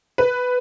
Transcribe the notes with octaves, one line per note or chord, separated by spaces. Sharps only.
B4